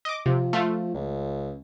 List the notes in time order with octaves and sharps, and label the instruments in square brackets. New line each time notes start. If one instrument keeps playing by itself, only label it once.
[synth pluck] D#5 D6
[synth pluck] C3 [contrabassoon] F3
[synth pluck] A3 F4
[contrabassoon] C#2